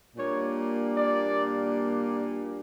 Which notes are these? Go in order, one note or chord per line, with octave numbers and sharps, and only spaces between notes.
A#2 G3 A#3 D4 C#5
D5